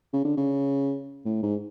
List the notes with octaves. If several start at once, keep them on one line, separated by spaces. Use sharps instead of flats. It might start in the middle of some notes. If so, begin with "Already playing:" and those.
C#3
D3
C#3
A2
G#2